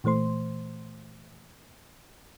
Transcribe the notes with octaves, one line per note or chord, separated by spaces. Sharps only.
A#2 E3 A3 C5 C6